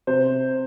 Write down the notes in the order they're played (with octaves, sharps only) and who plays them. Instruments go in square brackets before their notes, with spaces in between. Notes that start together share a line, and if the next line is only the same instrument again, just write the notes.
[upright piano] C3 C5